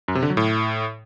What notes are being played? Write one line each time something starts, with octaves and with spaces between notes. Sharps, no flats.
F#2
C3
D3
F#3
A2